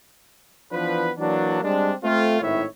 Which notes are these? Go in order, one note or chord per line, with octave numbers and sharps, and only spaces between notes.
E3 F3 B3 D4 B4
E3 F#3 A#3 D4
G3 G#3 C4 D4
A3 C4 F4
G#1 A2 D#4 E4 C#5 E5